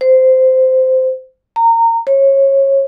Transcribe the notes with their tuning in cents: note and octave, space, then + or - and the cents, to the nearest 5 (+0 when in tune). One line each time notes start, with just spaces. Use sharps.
C5 -15
A#5 -25
C#5 -25